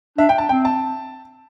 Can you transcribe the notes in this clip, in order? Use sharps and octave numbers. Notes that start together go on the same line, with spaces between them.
D4 E5
G5
A5
C4 G5
A5